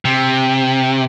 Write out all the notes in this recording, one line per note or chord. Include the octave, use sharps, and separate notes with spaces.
C3